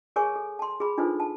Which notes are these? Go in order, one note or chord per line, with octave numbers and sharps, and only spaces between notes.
G#4 A#4 C#5 G#5 C#6
A4
A5 C6
G#4 B5
D4 D#4 F4 A4 B4 C5
A5